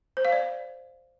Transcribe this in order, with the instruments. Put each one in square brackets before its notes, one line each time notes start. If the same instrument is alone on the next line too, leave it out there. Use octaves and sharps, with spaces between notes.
[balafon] C5
F5
D5